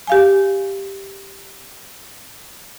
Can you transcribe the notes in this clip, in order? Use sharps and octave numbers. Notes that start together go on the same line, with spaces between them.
G4 F5 G#5